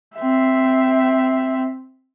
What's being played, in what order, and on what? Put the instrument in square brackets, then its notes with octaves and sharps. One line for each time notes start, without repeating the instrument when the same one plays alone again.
[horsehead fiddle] C4 E5